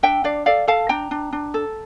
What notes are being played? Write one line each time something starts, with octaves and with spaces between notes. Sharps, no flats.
D4 E5 G5
D4 D5 F5
A4 D5 F5
A4 F5 A5
D4 G5 A#5
D4
D4
A4